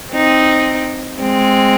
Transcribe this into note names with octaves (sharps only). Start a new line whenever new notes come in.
C4 D#4
G#3 C4